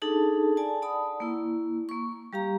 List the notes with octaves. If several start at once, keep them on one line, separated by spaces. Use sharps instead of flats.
D4 D#4 G#4 A4 A5
D5 G#5 A5
D5 F#5 A5 B5 D#6
A#3 E4
A#3 C#6
G3 G4 F5 A#5